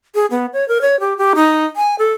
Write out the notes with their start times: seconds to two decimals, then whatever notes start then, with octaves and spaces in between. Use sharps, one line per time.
0.15 G#4
0.31 B3
0.53 C#5
0.68 A#4
0.81 C#5
1.00 G4
1.18 G4
1.35 D#4
1.76 G#5
1.99 A4